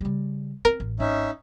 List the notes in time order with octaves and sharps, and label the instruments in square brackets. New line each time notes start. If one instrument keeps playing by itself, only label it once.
[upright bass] C#3 G3
[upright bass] C4 [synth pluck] A#4
[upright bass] A1
[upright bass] G#1 [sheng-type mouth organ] C#4 D#4 E5